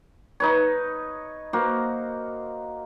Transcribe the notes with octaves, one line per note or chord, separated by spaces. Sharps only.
D#4 B4 C#5
A#3 F#4 C5